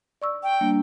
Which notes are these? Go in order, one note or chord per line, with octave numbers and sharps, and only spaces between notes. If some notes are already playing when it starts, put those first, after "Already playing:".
D5 C#6 E6
G5
G3 A#3 D4